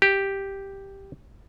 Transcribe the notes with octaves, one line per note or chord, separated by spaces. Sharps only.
G4